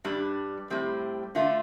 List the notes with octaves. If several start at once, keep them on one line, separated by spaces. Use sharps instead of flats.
G2 G3 D4
A2 G3 C4
D3 A3 F4